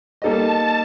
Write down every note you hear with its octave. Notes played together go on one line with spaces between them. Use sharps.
G3 A#3 D#4 A4 D#5 A5